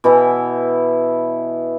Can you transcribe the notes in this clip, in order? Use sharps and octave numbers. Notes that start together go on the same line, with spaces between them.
B2 E3 E4 E5